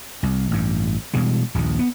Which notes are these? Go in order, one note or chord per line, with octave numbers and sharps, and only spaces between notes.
C2
A1 G2
B2 E3 G3 G#3
D#1 A#1 D#2
B3